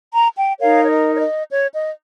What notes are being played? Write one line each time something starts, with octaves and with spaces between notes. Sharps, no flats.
A#5
G5
D#4 A#4 C#5 F5
C#5
D#5
C#5
D#5
C#5
D#5